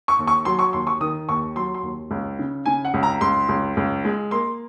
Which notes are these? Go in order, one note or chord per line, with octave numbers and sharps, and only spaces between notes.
C#6
D#2
C#6
F#3 C6
C#6
D#2 C6
C#6
D#3 D#6
D#2 C#6
F#3 C6
C6
D#2
C#2
C#3
C#3 G#5
F#5
C#2
A#5
C#2 C6
C#2
C#2
G#3
A#3 C6